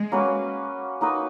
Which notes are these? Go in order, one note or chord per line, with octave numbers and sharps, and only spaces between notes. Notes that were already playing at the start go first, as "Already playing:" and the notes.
Already playing: G#3
A#3 C#4 F#4 B4
A#3 D#4 F#4 B4